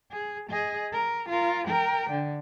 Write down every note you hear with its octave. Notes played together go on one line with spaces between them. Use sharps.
G#4
G#4 D#5
A#4
F4 A#4
A#4 G5
D3